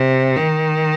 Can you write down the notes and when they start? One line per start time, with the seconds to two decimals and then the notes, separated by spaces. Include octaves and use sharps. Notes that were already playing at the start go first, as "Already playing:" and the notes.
Already playing: C3
0.36 D#3